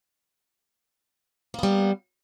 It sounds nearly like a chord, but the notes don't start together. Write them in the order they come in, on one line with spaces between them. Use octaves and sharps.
A#3 B3 G3